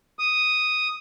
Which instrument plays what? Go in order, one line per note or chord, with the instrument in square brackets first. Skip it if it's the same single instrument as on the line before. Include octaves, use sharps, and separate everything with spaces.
[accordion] D#6